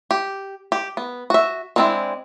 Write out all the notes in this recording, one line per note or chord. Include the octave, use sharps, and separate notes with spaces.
G4
G4
B3
F#4 E5
G#3 B3 C4 D4 E4